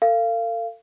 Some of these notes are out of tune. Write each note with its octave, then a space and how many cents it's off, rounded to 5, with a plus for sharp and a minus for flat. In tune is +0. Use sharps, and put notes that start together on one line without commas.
A4 +40 F5 -25